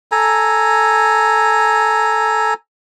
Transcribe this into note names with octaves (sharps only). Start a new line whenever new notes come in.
A4 G#5 A#5